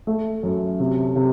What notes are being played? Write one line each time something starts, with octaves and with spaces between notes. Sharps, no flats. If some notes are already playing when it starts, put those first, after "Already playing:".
A3
F#2
C3
C3